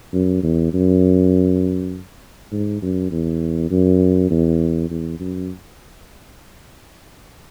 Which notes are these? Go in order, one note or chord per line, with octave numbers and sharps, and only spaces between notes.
F#2
E2
F#2
G#2
F#2
E2
F#2
E2
E2
F#2